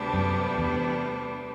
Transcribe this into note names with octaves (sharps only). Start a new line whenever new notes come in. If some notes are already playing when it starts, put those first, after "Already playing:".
Already playing: D2 C3 G3 B3 D4
F#2
E2